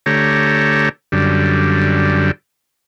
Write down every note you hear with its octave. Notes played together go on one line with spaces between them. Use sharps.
D3 A3 G4 C#5 A#5
F#2 D3 G3